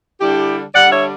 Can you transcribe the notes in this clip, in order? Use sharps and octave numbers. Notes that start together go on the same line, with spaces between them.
D3 G3 D4 E4 G4
D3 G3 D4 D5 F#5
C#5 E5